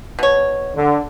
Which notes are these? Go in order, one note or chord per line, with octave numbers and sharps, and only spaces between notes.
B2 C#5
D3